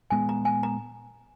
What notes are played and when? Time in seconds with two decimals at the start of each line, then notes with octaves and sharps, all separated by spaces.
0.10 A#2 G#3 B3 G#5
0.29 A#5
0.45 G#5
0.63 A#5